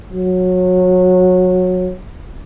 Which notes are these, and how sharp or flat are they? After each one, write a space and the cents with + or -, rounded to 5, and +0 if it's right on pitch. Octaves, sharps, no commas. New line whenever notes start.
F#3 -20